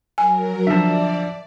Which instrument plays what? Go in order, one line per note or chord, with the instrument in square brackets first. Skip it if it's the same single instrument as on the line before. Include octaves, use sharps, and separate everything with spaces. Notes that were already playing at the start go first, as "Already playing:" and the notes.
[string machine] F#3 A#4 [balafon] G#5
[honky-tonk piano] D3 F3 [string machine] D5 [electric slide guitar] E5 A5